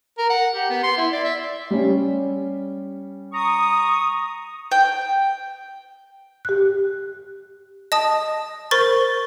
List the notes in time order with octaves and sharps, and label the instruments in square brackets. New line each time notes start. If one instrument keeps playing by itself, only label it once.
[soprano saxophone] A#4
F#5
G4
B3
C6
E4
D5
E5
[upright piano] G3 C#4
[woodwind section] A#5 C#6 D#6
[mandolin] G5
[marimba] G4 F#6
[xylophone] D#5 A5 D#6
A#4 C5 B5 C#6 A6